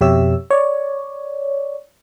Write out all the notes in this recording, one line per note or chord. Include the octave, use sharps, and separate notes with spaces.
F2 B2 G4 C#5 E5 E6
C#5 D5